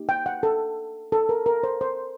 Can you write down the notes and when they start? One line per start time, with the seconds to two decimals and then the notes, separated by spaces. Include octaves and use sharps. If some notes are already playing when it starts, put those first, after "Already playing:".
Already playing: A#3 D#4 G4
0.09 G5
0.26 F#5
0.43 A4
1.12 A4
1.29 A#4
1.46 A#4
1.63 C5
1.81 C5